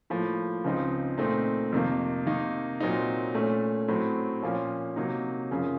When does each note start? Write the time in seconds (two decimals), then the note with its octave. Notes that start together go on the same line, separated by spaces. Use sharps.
0.10 A2 F3 A#3
0.64 C#2 C#3 F3 C4 D#4
1.18 A#2 A3 C4 D#4
1.72 F2 C3 D#3 A#3
2.26 C3 D#3 A#3 D#4
2.80 A#2 F#3 C4 D#4
3.34 A#2 A3 C#4
3.88 A2 F#3 C4
4.42 A#2 F3 A#3 C#4
4.96 C3 F#3 A#3 D#4
5.51 F#2 C#3 F3